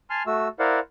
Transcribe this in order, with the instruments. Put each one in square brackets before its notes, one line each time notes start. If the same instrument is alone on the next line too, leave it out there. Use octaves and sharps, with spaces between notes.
[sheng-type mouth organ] G#5 A5 C6 F6
A3 F#4 E6
E4 A#4 C5 D5 F5 F#5